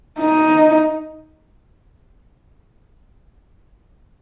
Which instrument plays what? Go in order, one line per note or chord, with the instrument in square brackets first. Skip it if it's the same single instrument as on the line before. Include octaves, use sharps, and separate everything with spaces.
[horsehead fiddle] D#4